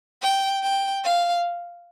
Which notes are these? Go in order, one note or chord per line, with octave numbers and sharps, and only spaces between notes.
G5
G5
F5